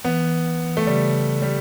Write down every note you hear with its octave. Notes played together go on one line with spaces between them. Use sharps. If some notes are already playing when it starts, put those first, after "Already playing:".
E3 B3
E3
E3
E3
A3
C#3 G3
C#3
C#3
G3